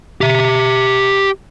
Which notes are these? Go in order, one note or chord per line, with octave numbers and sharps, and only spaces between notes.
G4 E5